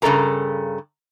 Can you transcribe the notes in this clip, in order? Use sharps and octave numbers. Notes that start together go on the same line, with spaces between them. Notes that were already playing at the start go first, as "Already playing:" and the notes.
G2 C#3 G3 A4 A#4 A#5